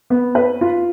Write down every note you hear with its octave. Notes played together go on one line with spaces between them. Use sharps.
B3
B4
F4